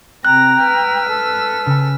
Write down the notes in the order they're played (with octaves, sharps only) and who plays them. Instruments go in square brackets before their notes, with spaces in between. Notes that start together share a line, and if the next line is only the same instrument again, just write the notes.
[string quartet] C3 A#6 [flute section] G5 A#5 [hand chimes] F#6
[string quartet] B4 E6 F6
[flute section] A4
[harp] C#3 G#5